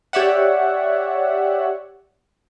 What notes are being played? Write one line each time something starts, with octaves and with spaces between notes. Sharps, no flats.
G4 C#5 D5 E5 F#5